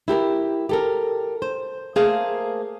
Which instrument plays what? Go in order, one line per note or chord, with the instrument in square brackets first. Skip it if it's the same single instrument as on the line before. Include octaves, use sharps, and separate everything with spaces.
[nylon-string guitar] E4 G4 A4 A#4
G4 A4 A#4
C5
A3 A#3 G#4 A#4 C5 F5